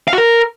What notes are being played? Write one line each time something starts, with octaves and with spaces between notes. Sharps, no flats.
F5
F#4
A#4